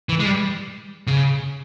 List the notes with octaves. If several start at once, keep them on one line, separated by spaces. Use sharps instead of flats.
E3
G#3
G3
C#3